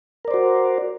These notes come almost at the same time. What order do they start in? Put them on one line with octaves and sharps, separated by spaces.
A#4 D5 C5 F#4